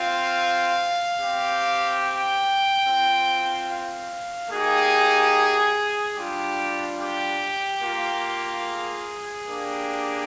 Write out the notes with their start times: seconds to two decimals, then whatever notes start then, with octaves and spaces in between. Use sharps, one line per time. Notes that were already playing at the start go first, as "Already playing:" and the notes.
Already playing: C4 F4 F5
1.20 C4 G4
2.02 G5
2.85 C4 F4
3.68 F5
4.50 A#3 D#4 G4 G#4
6.16 G3 D4 F4 G4
6.98 G4
7.82 A#3 F4
8.64 G#4
9.47 A#3 D4 G4